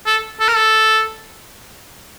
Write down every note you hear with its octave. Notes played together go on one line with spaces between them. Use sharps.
A4
A4
A#4
A4